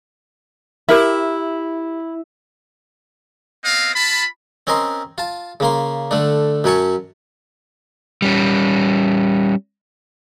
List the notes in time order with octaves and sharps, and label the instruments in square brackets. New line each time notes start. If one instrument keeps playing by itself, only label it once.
[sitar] E4 [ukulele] G4 A#4 E5
[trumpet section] B3 C4 D#5 F5
F4 A5 B5
[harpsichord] C4 C#4 A#4 D#5 C6
F4 A5
C#3 A#3 C6
D3 A3 D4
F#2 F#3 C#4 C#5 A5 C#6
[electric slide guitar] G3 C#4